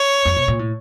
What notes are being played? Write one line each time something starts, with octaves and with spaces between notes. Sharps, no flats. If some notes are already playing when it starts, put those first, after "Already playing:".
Already playing: C#5
F2
B2
A#2
A2